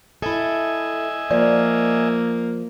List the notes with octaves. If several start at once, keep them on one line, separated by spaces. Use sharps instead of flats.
E4 A4 D#5 E5 G#5
F3 A#3 D5